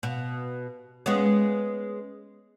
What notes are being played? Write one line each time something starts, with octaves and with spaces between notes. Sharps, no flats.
B2
G#3 B3 C#4